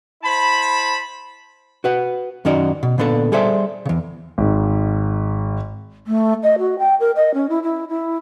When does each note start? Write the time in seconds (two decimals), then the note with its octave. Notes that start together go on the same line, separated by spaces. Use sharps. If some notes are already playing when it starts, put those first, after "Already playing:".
0.23 E4 C5 A5 B5
1.84 F#4 B4 F#5
2.45 F#2 D#3 C#4 D#4 F#4 D5
2.83 B2
2.98 A#2 D3 B3 D4 A4
3.32 G3 G#4 A4 C5 D5 E5
3.85 E2 C#3
4.38 G#1 G#2
6.07 A3
6.43 D#5
6.59 F#4
6.79 G5
7.00 A#4
7.16 D#5
7.34 C#4
7.49 E4
7.63 E4
7.89 E4